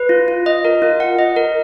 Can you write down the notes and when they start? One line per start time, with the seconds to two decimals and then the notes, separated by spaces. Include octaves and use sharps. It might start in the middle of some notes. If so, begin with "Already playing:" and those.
Already playing: B4
0.09 F4
0.28 F4
0.46 D#5
0.65 A#4
0.82 F4
1.00 F#5
1.19 D#5
1.36 A#4